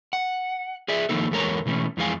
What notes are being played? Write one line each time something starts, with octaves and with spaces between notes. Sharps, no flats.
F#5
G#4 D5 E5
D#3 F3 A#3 D#4 A4
E2 G#3 A4 A#4 C#5 A#5
B2 E3 A3 C#4
F2 E3 G#3 F5 G#5